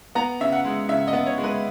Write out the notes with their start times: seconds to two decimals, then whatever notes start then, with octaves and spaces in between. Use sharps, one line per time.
0.15 B3 A#5
0.41 C#3 E5
0.52 F#5
0.65 G#3
0.89 C#3 E5
1.08 D#5
1.13 B3
1.26 C#5
1.38 G#3
1.44 B4